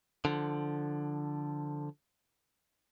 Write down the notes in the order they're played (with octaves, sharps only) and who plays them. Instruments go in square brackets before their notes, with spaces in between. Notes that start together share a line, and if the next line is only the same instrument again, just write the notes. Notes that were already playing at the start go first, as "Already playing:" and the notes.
[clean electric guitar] D3 F3